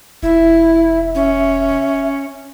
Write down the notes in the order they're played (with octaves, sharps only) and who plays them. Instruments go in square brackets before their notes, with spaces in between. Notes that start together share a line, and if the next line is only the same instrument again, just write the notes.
[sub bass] E1 [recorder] E4 [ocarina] E5
[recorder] C#4